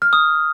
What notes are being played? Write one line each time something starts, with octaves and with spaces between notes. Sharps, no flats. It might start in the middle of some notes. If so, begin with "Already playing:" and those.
F6
D#6